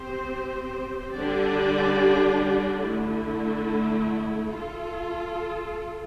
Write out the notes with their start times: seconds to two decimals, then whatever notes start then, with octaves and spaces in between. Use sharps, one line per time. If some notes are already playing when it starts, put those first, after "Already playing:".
Already playing: C4 G4 C5
1.13 D3 G3 D4 G4 D5
2.81 D3 A3 E4
4.51 F4 A4